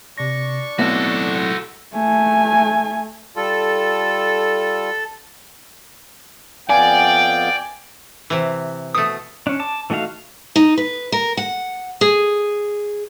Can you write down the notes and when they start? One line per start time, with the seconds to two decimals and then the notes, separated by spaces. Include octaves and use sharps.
0.18 C3 D4 C#6 A#6
0.79 B1 A2 B3 C4 F#4 A4
1.94 A3 G#5
3.36 G3 F4 A4
6.69 F2 B3 D5 F5 G5 G#5
8.30 C3 E3
8.94 B2 A3 D#6
9.47 C#4 D4
9.60 A5 D6
9.90 E3 A3 D#4 F#4 F5
10.56 D#4
10.78 B4
11.12 A#4
11.37 F#5
12.01 G#4